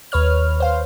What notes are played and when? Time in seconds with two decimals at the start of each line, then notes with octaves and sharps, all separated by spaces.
0.12 D#2 B4 C#5 F6
0.60 C5 F5